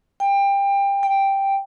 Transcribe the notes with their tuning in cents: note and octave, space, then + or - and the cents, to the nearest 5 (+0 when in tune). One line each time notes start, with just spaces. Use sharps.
G5 +25
G5 +0